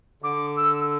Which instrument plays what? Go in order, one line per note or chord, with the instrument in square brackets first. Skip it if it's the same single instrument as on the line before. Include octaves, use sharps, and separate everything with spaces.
[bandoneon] D3 [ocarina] D6
[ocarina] E6